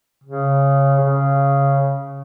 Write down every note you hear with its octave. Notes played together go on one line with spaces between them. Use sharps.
C#3
C#3